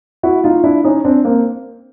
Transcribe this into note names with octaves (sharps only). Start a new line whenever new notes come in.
E4 F#4
D#4 F4
D4 E4
C#4 D#4
C4 D4
A#3 C4